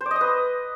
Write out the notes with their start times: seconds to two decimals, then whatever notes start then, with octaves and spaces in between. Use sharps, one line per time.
0.01 C5
0.06 D5
0.11 D#5
0.16 D#6
0.21 B4